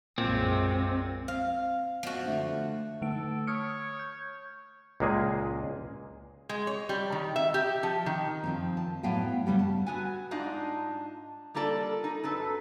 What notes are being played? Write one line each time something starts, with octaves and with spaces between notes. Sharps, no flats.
B1 F#2 A#2 G#3 C4
C4 F5
F3 B3 F#4 D#5 F5
D3 A3 D4
D3 A3 A4 D7
C#5 D#6 F6 C#7
G6
C#2 A#2 G#3 A#3 G#4
G#3
C#5
G3
D#3
E5
G4
F3
D#3
D#3 F3 C4
A5
A2 F#3 B3 F5 G5 A5
C#3 G3 B3 G4
A5
B3 F#4 G#5
G#2 D4 D#4 F4
G3 A#3 F4 A4 D5
D#4
F#2 A4 B4